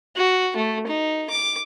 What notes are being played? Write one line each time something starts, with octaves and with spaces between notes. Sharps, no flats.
F#4
A3
D#4
D6